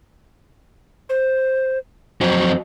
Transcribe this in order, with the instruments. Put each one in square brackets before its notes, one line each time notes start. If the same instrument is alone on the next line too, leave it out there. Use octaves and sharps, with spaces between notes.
[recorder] C5
[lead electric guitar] F2 F#3 [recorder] C5